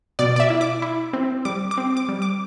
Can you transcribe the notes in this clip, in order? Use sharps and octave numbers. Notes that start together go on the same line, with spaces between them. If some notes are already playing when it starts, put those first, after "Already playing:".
B2 D5
D5
E5
E4
D6
E4
C4
G3 D6
D6
C4
D6
G3
D6